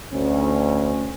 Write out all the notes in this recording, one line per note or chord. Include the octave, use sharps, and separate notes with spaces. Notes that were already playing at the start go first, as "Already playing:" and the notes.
D2 C#4